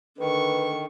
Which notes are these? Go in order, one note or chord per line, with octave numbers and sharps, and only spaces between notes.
D3 D#3 B4 C#6